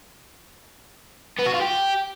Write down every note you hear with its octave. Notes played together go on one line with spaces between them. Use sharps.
B3
F#4
F4
G4